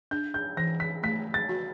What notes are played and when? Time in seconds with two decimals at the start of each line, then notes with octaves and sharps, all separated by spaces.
0.11 D4 G6
0.34 G6
0.57 E3 A#6
0.80 B6
1.03 A3 B6
1.34 A6
1.49 F#4